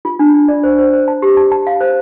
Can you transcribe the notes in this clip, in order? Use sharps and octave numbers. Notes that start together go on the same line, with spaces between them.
F4
D4
D4
D5
C5
C5
C5
A5
G4
A5
A5
F5
C5